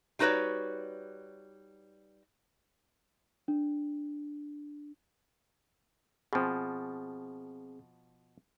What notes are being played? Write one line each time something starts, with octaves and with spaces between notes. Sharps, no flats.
G3 D#4 F#4 B4 C#5 D5
D4
B2 F3 C4 G#4